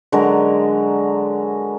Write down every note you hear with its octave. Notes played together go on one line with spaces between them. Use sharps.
D3 F#3 G#3 A#4